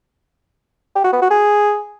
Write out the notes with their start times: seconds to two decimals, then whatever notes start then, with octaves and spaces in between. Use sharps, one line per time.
0.96 G4
1.04 F#4
1.13 B3
1.22 F#4
1.30 G#4